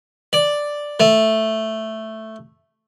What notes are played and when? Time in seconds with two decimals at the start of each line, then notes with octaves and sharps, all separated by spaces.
0.33 D5
1.00 A3